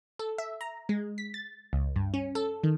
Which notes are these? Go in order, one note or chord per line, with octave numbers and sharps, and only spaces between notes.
A4
E5
A#5
G#3
B6
A6
C#2
G2
C#4
A4
D#3